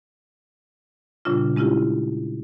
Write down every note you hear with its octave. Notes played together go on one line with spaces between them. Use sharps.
A#2 C#3 G3 D4 F4
G#3 C#4 E4 F4 G4